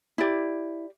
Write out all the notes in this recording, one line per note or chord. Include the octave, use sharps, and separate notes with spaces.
E4 G4 D5